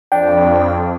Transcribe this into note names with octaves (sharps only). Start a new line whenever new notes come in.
F2 D4 G5